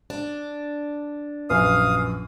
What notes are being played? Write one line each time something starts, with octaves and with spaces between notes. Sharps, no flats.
D4
A#1 F#2 B4 F5 D#6